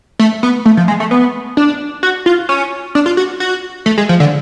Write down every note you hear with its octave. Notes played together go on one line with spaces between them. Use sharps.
A3
B3
A3
F3
G#3
A3
B3
D4
F#4
F4
C#4
D4
F4
F#4
F#4
A3
G#3
F3
D3